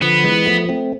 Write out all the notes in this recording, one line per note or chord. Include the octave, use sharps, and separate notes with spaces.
D3 F3 B3
E3 G#3
F3 A3
A3 C4